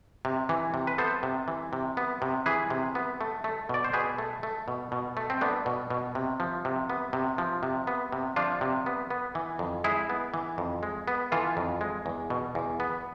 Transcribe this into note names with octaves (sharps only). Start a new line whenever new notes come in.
C3
E3
C3
B4
B3 A4 C5
C3
E3
C3
B3
C3
E3 G#4 B4
C3
B3
A3
A3
B2 D5
C5
B2 G#4 B4
A3
A3
B2
B2
A3
C4
A3 B3 D4
B2
B2
C3
F3
C3
B3
C3
F3
C3
B3
C3
F3 D4 F4
C3
B3
B3
E3
F2
G#3 E4 G#4
B3
E3
F2
G#3
B3
E3 F4 A4
F2
G#3
E2
B2
E2
B3